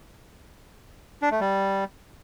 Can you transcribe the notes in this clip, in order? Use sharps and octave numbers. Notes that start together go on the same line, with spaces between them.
D4
A3
G3